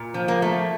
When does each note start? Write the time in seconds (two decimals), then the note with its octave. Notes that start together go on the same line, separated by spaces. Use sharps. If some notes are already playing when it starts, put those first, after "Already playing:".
Already playing: A#2
0.14 F3
0.28 A#3
0.42 A3